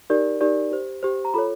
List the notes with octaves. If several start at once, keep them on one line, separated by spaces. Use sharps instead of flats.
D#4 G4 A#4 D5
D#4 G4 A#4 D5
G4 C5
G4 C5
A#5
F4 A4 C#5 B5